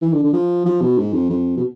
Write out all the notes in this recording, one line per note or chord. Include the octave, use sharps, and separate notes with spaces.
E3
D3
D3
F3
F3
B2
G#2
F2
F2
B2